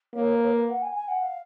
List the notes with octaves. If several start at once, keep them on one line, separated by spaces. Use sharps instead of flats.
A#3 C#5
B4
C#5
B4
F#5
G#5
G#5
F#5
F5